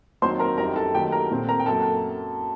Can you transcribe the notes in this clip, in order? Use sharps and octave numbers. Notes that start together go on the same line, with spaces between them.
D#2 D#3 F#3 C4 C5 C6
A#4 A#5
F#2 D#3 G3 A#4 A#5
A4 A5
D#2 D#3 F#3 A3 G4 G5
A#4 A#5
A#2 A3 C4
A#4 A#5
G5
F#2 F#3 A#3 A4 A5